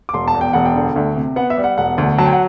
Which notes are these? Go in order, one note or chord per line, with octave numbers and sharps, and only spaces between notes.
D6
E1 C6
A5
E2
G5
E1 F#5
G5
D3
D2
C3
B3 F#5
E5
G3
F#5
E1 F#5
D2
F#3 A5
G5
F#5